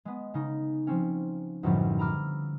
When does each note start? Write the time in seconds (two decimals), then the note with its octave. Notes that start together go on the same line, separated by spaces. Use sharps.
0.05 G#3 B3
0.34 C#3 D#4
0.87 F3 C4 C#4
1.63 B1 F#2 A2 D3 F3 G3
1.99 A#5 B5 D6 E6 F6